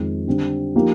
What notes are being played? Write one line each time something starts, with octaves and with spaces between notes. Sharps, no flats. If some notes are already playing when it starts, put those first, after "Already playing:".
Already playing: F2 D#3 G#3
D3 G3 C4
F3 A#3 D#4 G4